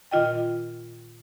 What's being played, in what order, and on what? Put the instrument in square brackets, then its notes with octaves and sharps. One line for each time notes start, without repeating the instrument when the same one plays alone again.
[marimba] A#2 D#3 F4 D#5 G5